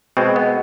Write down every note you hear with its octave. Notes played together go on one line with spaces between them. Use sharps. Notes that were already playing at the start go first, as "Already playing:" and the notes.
B2 G#3 C4
B3